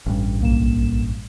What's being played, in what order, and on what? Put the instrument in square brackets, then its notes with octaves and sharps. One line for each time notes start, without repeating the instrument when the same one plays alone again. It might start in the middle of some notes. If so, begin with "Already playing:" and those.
[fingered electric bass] A1 G2
[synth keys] B1 A#3 E7